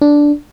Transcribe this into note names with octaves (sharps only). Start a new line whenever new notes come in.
D4